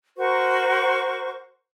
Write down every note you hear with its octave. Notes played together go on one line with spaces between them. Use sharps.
F#4 A#4 C5 C#6